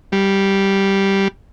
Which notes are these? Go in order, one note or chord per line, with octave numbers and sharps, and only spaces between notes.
G3